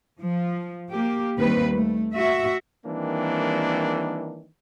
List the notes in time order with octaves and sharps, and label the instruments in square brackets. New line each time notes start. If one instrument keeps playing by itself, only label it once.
[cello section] F3
A#3 G4
D#2 D#3 G3 C4 B4
A3
F#4 E5
[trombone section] D#3 E3 G3 A#3 C4 D4